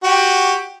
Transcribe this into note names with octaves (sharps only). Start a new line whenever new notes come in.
F#4 G4